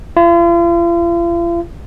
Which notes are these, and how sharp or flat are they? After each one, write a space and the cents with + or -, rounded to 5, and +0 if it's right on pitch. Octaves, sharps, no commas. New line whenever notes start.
F4 -40